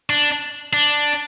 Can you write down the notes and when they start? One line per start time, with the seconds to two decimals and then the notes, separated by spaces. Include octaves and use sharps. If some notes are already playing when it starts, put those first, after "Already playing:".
0.10 D4
0.73 D4